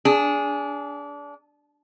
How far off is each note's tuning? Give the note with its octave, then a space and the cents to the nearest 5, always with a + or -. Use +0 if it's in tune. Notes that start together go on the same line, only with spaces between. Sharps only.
D4 -25 G#4 +0